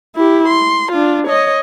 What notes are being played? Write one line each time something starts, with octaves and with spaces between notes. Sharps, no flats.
E4 G4
C6
D4 F4
C#5 D#5